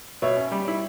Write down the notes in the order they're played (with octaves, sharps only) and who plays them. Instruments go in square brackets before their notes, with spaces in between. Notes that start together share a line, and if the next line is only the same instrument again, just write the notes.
[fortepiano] B2 [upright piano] C#5 E5
[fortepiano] C#4
G3
E4